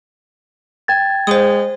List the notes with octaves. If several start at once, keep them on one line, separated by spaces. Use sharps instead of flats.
G5 G#6 A6
G#3 C5 D#6